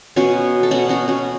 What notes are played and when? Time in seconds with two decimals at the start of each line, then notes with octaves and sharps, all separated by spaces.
0.16 B2 B3 C#4 F#4
0.63 A4
0.71 B2 B3 C#4 F#4
0.89 C#4 F#4
1.08 C#4 F#4